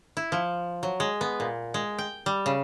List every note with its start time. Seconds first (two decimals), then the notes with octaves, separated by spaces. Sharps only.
0.17 E4
0.32 F3
0.83 F#3
1.00 G#3
1.21 B3
1.40 A#2
1.74 G#3
1.99 G5
2.26 G3
2.46 C#3